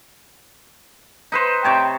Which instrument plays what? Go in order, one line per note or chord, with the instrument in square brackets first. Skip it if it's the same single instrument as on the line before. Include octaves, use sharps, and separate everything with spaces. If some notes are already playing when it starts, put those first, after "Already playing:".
[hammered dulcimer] D#4 B4 C5
[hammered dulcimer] C3 C#5 A5 [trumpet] G5